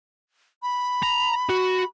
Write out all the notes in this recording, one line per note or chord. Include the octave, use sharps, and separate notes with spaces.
B5
A#5
F#4